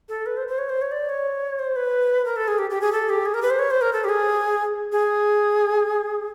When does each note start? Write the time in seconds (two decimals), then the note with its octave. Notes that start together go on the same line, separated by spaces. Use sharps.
0.09 A4
0.26 B4
0.37 C5
0.48 C5
0.58 C#5
0.69 C5
0.81 C#5
0.91 D5
1.09 C#5
1.59 C5
1.76 B4
2.25 A#4
2.36 A4
2.48 G#4
2.58 G4
2.70 G4
2.81 G#4
2.92 A4
3.09 G4
3.25 G#4
3.34 A#4
3.42 B4
3.50 C5
3.59 C#5
3.71 C5
3.81 A#4
3.93 A4
4.04 G4
4.09 G#4
4.92 G#4